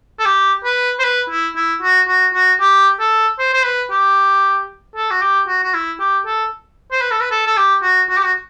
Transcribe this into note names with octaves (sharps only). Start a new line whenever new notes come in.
A4
G4
B4
C5
B4
E4
E4
F#4
F#4
F#4
G4
A4
C5
C5
B4
G4
A4
F#4
G4
F#4
F#4
E4
G4
A4
C5
B4
A4
B4
A4
A4
G4
F#4
F#4
G4
F#4